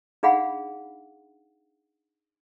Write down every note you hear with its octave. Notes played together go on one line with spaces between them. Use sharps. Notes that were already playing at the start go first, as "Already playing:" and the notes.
D4 D#4 G#4 F5 F#5 B5